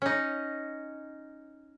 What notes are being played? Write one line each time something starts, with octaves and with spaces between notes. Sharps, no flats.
C#4 D#4